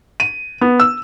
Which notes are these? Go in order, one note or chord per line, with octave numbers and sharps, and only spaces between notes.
D#7
B3
E6